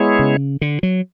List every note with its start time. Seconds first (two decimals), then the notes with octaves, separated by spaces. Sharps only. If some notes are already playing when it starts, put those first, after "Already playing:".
Already playing: G#3 B3 E4 G#4 C#5
0.19 C#3
0.61 D3
0.83 F#3